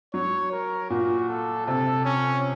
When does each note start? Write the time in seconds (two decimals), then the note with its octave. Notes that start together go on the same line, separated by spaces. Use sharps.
0.14 F#3 C#5
0.52 A#4
0.90 A#2 F#4
1.29 A4
1.67 C3 A4
2.05 C#4